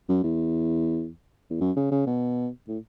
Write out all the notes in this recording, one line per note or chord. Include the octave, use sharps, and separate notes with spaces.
F#2
E2
E2
F#2
C#3
C#3
B2
A2